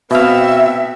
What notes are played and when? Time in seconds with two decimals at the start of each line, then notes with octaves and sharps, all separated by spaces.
0.11 B2 B3 C4 E5 F5